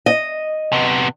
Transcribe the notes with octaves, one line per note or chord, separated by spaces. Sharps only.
D#5
C3 B3